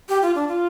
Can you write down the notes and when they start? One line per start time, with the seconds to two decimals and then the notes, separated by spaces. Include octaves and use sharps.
0.09 G4
0.22 F4
0.35 D4
0.48 F4